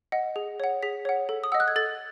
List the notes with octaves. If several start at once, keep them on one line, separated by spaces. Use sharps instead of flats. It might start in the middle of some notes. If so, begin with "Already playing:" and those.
D#5 F#5
G#4
C#5 F#5
G#4 B6
C#5 F#5
A4
D#6
D#5 F#5 E6
F#6
G#6
A4 A6